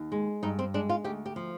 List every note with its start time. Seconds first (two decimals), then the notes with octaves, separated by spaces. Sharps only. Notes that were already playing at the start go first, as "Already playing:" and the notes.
Already playing: D#2
0.12 G#3
0.43 G2 D#4
0.59 C4
0.74 G#3 D4
0.89 F4
1.04 D2 G4
1.26 G4
1.36 F3